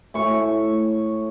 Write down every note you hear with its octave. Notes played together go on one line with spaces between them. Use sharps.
A2 C#6